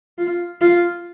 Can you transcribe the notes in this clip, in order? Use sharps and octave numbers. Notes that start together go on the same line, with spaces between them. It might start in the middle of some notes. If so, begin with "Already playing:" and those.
F4
F4